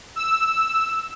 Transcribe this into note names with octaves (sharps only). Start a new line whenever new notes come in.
E6